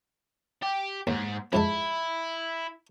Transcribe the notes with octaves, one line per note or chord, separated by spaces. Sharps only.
G4
D#2 G#2
F2 G#2 E4 A5